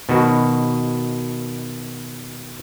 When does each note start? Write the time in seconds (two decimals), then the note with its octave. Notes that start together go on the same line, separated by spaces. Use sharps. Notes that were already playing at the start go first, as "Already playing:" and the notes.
0.09 B2 D#3 F#4